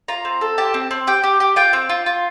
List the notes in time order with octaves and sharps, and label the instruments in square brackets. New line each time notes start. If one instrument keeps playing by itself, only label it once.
[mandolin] F4 A#5
C4
A4
G4 A5
C4
C4
G4 G5
G4
G4
F4 G5
C4
F4
F4